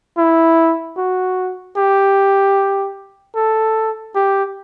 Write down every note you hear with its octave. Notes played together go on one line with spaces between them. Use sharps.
E4
F#4
G4
A4
G4